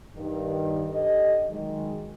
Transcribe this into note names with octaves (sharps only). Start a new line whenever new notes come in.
G2 D#3
D4 G4 A4 D#5
D#3 F#3 G#3